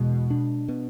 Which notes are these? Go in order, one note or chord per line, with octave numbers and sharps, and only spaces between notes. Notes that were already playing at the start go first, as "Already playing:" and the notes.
Already playing: E2 B2 G#3
D4
B2